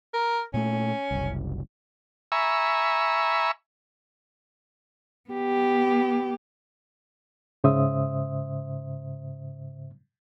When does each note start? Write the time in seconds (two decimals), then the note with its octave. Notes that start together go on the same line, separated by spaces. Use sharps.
0.14 A#4
0.54 A#2 A3 C#4
1.11 F#1 C2
2.32 E5 G#5 A#5 B5 C#6 E6
5.30 B3 G4
7.64 G#2 C#3 C5 E5 D#6